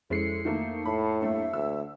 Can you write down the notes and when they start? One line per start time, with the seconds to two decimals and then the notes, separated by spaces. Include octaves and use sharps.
0.10 F2 G#3 C#4 E4 A4 C7 C#7
0.45 D#3 A3 A#3 E5
0.86 A2 A5 B5
1.21 G2 A3 A#3 E5
1.53 D2 E6